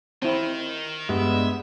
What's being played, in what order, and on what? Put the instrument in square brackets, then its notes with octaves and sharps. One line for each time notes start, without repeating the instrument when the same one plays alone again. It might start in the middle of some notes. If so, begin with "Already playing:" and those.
[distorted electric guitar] D#3 [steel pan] C4 E4
[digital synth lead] G2 [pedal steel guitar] G#3 B3 [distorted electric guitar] E5